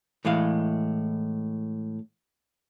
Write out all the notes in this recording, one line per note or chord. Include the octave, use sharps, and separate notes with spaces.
A2 E3 G#3 F5